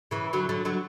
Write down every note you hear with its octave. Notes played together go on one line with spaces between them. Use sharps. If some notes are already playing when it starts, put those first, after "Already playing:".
C#3 E3
D3 F#3
D3 F#3
D3 F#3